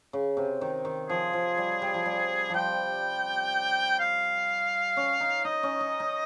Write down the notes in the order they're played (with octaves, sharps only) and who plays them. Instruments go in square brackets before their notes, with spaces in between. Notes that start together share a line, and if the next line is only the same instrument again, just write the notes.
[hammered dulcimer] C#3
C3
D#3
D#3
[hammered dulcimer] F3 [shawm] G#4
[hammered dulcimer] F3
G3
G3
F3
G3
[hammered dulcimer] F3 G3 [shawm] G5
[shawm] F5
[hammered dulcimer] C#4
D#4
[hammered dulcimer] D#4 [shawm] D#5
[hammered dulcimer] C#4
D#4
D#4